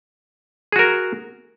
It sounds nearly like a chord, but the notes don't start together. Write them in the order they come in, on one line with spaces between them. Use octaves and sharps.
G#4 F#4 A#4